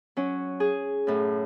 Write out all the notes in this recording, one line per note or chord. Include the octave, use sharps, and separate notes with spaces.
F#3 C#4
G#4
F#2 A2